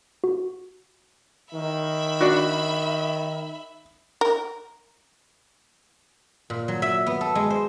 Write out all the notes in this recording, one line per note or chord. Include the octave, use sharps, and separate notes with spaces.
F#4
D#3 E5 B5
D4 F#4
A#4
A#2
F#3
E5
B3
A4
G#3
C5